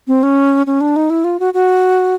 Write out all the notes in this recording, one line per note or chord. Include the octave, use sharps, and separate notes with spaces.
C4
C#4
C#4
D4
D#4
E4
F4
F#4
F#4